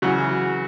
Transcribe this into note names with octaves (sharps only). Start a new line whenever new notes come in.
C#3 E3 F#3 F#4